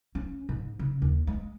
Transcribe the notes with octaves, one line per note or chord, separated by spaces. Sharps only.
C#4
G#2
C#3
D#2
G#3